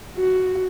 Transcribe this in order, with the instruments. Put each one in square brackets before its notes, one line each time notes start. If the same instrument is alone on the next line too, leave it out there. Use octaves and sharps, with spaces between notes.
[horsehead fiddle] F#4